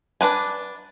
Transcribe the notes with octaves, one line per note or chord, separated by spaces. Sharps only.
D4 B4 G#5